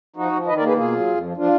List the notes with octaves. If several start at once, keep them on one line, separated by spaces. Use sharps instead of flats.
F3 D#4 F#4
F3
D#3 B4 D#5
A#4 D5
A#3 G#4 B4
B2 F4 G#4
F#3
F2
F3
F3 D4 F4